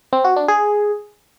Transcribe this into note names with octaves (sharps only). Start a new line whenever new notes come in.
C4
F#4
D4
G#4